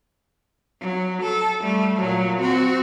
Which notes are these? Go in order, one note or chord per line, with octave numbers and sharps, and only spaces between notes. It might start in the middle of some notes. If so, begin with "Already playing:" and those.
F#3
A4
G3 A3
A#2 F#3
C4 F#4